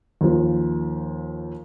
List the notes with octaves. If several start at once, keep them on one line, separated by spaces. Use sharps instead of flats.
D#2 F3